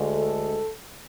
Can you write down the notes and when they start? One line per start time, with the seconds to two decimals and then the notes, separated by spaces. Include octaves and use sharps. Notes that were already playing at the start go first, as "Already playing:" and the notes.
Already playing: D2 D3 G#3
0.14 A4